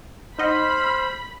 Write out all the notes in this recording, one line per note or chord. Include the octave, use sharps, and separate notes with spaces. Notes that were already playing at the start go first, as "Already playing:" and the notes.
D#4 C5 D#5 F#5 B5 F6